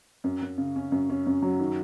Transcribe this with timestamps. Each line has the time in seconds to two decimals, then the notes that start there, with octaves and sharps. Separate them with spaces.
0.24 F#2
0.42 F#2
0.58 C#3
0.76 C#4
0.92 F#2
1.10 C#4
1.27 F#2
1.42 F#3
1.60 D#3